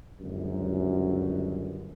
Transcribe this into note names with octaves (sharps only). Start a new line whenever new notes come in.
G1 C#2 F#2